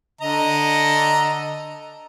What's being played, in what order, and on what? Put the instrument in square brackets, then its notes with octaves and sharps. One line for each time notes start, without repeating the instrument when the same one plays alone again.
[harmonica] D3 D#5 A#5